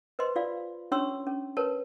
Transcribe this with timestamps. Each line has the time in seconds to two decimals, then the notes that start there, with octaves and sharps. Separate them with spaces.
0.19 B4 C5 D#5 C6
0.36 F4 D5 F5
0.92 C#4 D4 C#5 C6 C#6 E6
1.27 C#4
1.57 A#4 B4 C#5 A5